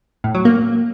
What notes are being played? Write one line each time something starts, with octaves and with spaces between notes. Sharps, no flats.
A2
F#3
A#3